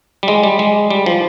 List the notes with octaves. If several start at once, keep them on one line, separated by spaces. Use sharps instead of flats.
G3
G#3
G3
G#3
G3
F3